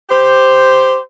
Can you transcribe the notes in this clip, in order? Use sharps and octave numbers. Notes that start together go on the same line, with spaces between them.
G4 C5